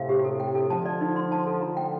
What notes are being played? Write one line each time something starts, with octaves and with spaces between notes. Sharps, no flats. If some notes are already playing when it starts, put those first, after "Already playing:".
Already playing: A2 C3 F5
G4
A4
G5
A4
D3 F3 A5
D5
D#4
C6
A5
A4
D3 F3 A#5
G5